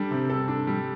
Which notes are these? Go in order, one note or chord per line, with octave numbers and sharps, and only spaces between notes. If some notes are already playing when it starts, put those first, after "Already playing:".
Already playing: G3 D4 A4
C3
A4
D4
G3